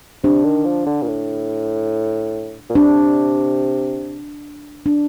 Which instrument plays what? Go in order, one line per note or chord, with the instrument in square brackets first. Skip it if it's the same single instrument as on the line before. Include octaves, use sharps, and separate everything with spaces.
[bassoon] C3 [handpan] D4
[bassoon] D#3
F3
D3
A#2
A2
A#2
[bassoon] C3 [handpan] D4
[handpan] D4